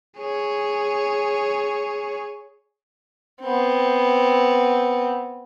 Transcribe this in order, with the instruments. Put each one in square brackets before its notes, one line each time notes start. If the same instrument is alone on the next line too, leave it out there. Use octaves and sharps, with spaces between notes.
[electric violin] G#4 C#5
[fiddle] B3 C4